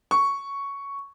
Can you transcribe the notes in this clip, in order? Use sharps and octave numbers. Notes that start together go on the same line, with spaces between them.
C#6